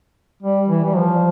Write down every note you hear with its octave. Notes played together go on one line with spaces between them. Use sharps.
G3
E3
G3
F3